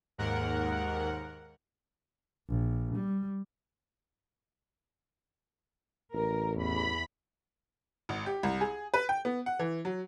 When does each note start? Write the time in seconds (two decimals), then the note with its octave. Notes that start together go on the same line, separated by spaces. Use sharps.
0.18 D#2 G#2 A#4 F#5
2.49 A#1
2.96 G3
6.14 A1 A#4
6.57 E2 B5
8.09 G#1
8.26 G4
8.43 C2
8.61 G#4
8.94 B4
9.09 G5
9.25 B3
9.46 F#5
9.59 E3
9.85 F#3